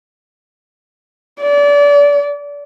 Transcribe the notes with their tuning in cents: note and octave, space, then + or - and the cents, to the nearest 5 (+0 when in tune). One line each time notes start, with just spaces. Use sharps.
D5 -30